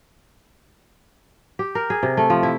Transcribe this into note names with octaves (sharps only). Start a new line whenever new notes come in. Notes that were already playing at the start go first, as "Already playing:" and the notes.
G4
A#4
G#4
C3
A3
F3
E4